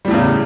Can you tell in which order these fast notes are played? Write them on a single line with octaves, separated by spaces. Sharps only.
G3 A2 E2 C#3